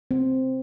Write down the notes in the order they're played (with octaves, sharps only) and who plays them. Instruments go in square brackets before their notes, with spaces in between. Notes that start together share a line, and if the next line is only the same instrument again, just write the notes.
[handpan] C4